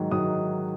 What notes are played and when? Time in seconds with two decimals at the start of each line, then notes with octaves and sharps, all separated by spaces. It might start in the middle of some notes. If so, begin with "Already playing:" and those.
Already playing: G#2 D#3 F#3
0.11 G#2 D#3 F#3 D#6